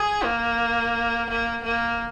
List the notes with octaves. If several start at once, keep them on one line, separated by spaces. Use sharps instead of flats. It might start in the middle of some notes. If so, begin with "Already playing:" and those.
Already playing: G#4
A#3
A#3
A#3